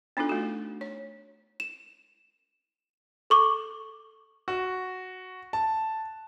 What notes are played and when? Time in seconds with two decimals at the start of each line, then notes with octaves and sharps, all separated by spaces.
0.17 B3 D4 D#4 F4 A4
0.29 A3 F#4
0.81 C#5
1.60 E7
3.30 A4 C#6 D6
4.48 F#4
5.53 A5